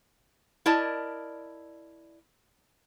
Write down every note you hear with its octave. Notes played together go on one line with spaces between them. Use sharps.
E4 A#4 D5 D#5 A5